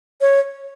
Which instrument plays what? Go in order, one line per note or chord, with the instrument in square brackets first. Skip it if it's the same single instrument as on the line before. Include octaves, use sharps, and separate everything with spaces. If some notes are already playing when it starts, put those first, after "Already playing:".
[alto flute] C#5